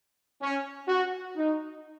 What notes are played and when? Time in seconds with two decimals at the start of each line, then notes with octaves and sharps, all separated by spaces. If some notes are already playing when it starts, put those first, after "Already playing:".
0.41 C#4
0.88 F#4
1.37 D#4